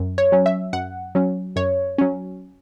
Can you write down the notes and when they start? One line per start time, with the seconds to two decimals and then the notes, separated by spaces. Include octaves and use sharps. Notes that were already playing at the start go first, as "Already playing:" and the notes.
Already playing: F#2
0.18 C#5
0.32 F#3 C#4
0.46 E5
0.73 F#2 F#5
1.15 F#3 C#4
1.56 F#2 C#5
1.98 F#3 C#4